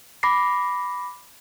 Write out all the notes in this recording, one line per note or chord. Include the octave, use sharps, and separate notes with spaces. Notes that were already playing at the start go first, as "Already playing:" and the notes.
B5 D6 A#6 C7